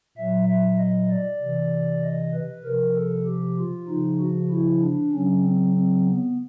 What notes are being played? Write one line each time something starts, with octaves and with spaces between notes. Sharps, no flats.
A#2 F#3 E5
E5
D#5
D5
C3 E3
D#5
B4
C3 F3 A#4
A4
G4
F4
C#3 F3 D#4
F#4
E4
D4
C#3 F#3 C#4
C4
C4
B3